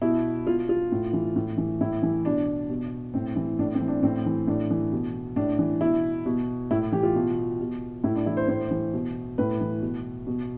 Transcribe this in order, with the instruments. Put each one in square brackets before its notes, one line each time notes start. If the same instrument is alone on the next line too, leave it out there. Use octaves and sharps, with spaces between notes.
[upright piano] B2 E4
B2 F4
F4
A2
E3
A2
E3
A2 E4
E3
B2 D4
B2
A2 C4
E3
A2 D4
C4
E3
D4
A2 C4
E3
A2 D4
E3
B2
A2 D4
E3
B2 E4
B2
A2 E4
E3 G4
F4
B2
B2
A2 E4
D4
E3 E4
C5
A2 C5
E3
B2
A2 B4
E3
B2
B2